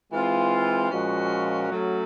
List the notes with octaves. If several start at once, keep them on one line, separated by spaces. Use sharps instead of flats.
E3 G#3 C4 F4
A#2 F3 G#3 C#4 F#4
F#3 A3 C#4